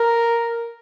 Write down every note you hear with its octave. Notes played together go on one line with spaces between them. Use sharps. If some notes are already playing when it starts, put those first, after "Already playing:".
Already playing: A#4